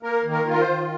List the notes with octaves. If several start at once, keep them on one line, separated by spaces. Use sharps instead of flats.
A#3 A#4
D#3
A#4
F4
A#4
C5
D#3